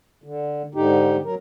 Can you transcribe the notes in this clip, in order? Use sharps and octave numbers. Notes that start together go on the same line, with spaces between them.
D3
G#2 D3 D#4 G4
F#3 A#4